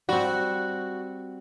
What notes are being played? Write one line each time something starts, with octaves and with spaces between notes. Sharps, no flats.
G3 C4 F#4